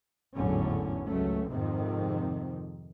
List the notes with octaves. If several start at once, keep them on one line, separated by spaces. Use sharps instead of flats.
G#1 E2 A2 D3 F#3 C#4
C#2 F#3 A3 C#4
F2 G#2 C3 D#3 C4